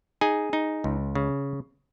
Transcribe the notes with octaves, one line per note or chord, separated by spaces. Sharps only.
D#4 G#4 G#5
D#4
C#2
C#3